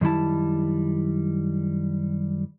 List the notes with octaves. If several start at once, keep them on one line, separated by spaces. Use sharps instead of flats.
F#2 D#3 G3 E4 A5